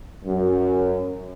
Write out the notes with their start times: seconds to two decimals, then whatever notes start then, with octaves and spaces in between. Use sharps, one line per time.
0.25 F#2